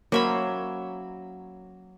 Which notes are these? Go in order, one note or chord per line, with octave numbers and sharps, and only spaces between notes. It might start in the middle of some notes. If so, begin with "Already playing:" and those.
F#3 A#3 C#4 C5 E5 B5